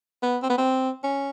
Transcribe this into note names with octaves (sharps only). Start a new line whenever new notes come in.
B3
C4
B3
C4
C#4